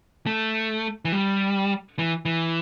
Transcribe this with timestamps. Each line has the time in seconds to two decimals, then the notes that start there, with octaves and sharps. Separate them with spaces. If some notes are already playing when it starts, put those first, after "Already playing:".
0.26 A3
1.05 E3
1.12 G3
1.99 E3
2.25 E3